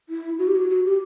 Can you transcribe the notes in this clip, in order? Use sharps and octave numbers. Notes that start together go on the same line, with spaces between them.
E4
F#4
G4
F#4
F#4
G4